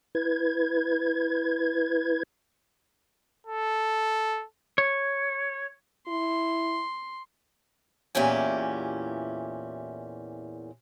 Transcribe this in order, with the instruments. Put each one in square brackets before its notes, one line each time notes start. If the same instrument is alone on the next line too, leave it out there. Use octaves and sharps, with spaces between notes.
[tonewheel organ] E4 B4 G#6
[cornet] A4
[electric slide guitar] C#5
[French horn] E4 [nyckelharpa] C6
[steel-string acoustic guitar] E2 A#2 E3 C#4 G4 G#5